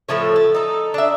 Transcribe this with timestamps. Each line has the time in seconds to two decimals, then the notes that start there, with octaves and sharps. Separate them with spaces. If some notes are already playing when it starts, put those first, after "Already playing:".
0.09 A2 F3 A3 C#5
0.36 A4
0.54 D#4 A4
0.94 D4 E5